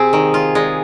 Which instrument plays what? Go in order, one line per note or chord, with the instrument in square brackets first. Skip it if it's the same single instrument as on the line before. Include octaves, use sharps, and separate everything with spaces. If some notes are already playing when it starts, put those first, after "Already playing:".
Already playing: [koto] C3 C4 [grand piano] G#4
[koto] D#3
F4
G#3